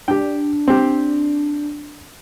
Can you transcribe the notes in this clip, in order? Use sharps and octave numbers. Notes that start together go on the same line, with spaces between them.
D4 G4 G5
C4 G4